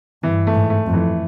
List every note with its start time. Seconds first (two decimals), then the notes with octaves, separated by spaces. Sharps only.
0.23 G2 E3
0.47 A3
0.54 G#2
0.70 A3
0.86 F2
0.93 E3